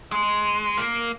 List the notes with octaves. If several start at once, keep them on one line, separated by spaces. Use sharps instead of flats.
G#3
A#3